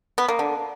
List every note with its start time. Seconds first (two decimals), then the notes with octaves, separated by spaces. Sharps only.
0.18 B3
0.28 A#3
0.39 D3